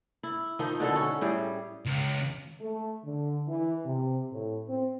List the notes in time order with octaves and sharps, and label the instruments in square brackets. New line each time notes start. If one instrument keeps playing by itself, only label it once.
[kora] E4
D#3 F3 D#4
B2 D3 E4 A4
C#4
A2 G3 G#4
[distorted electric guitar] C#2
[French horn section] A3
D3
E3
C3
A2
C4